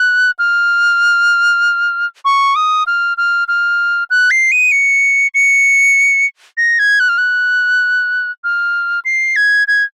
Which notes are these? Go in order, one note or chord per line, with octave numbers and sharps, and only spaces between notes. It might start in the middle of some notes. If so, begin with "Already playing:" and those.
Already playing: F#6
F6
C#6
D#6
F6
F6
F6
F#6
C7
D#7
C#7
C#7
A#6
G#6
F#6
F6
F#6
F6
C7
G#6
G#6